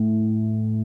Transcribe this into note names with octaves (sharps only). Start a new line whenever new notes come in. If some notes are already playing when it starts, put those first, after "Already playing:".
Already playing: A2